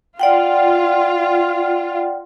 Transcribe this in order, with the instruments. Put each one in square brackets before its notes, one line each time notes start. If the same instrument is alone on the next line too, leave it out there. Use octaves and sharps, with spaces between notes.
[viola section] F4 [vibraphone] D5 F#5 G5